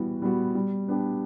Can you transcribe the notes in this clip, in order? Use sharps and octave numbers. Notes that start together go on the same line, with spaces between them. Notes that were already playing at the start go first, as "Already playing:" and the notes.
Already playing: E3 G3 B3 F#4
G3 B3 F#4
G3
B3 D4 G4